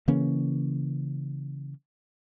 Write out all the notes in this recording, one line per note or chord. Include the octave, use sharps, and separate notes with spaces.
C#3 E3 A#3 C#4